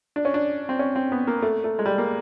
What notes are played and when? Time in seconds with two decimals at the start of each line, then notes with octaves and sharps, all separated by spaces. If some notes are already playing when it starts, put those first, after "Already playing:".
0.16 D4
0.25 C#4
0.34 D4
0.69 C4
0.79 C#4
0.96 C4
1.12 B3
1.27 A#3
1.42 A3
1.64 A3
1.79 G#3
1.86 G3
1.98 A#3